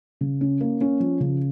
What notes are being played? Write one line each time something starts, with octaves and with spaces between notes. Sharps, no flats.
C#3
C#4
A#3
C#4
F3
C#3